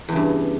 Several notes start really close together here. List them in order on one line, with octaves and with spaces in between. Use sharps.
E2 C#3 G2